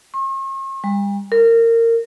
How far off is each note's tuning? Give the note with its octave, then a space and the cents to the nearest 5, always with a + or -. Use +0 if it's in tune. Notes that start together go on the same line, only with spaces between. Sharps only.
C#6 -45
G3 +45
A#4 -20